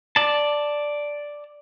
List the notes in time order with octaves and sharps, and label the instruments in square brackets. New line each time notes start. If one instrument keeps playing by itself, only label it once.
[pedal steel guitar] D5 A5